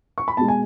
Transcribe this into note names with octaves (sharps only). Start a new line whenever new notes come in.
C#6
B5
B2 G#3 A5
G#5